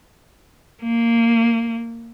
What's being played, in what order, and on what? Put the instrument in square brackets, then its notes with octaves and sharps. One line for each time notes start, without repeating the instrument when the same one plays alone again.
[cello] A#3